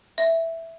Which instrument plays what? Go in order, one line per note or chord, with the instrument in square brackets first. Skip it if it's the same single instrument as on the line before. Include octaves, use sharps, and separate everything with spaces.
[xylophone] E5